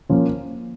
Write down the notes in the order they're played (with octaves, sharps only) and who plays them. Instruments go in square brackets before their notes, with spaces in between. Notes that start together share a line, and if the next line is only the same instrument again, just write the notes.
[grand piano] F3 A#3 C#4